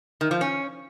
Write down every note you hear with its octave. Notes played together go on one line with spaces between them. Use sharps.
D#3
F3
C#4